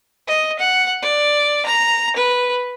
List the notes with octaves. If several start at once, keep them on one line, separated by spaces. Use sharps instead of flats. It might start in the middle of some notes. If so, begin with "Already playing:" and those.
D#5
F#5
D5
A#5
B4